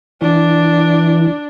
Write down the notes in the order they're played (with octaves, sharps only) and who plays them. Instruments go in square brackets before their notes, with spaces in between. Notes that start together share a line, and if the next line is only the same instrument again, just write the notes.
[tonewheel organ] E3 [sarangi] D4